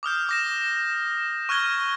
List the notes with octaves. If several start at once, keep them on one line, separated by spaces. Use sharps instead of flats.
D6 D#6 F6 G6
D6 A#6 E7
C#6 F6 F#6 G#6 G7